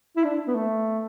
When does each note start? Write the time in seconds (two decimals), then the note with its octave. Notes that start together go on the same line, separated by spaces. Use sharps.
0.16 E4
0.24 D4
0.47 B3
0.55 A3